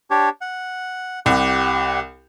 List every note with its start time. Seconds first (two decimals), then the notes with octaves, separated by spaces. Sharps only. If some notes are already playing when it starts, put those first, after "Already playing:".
0.10 D4 G4 C#5
0.41 F#5
1.26 C2 G4 F#5